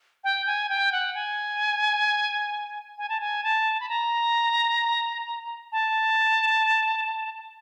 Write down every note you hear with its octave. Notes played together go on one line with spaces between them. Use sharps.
G5
G#5
G5
F#5
G#5
G#5
A5
G#5
A5
B5
A#5
A5